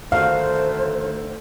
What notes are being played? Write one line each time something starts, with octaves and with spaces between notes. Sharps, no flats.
D3 D#3 A3 F#4 C5 F5